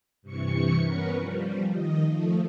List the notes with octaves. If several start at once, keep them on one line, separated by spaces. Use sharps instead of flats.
G2 C3 E3 C#6 C#7
B3 C#4 A#4 B4
F3 G3
D#3 D#5
F3 A3